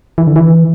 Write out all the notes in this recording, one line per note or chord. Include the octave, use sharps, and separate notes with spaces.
E3
D3
E3